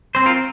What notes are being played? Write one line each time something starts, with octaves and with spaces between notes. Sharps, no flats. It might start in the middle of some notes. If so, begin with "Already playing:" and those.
C4 C5
F4 A#4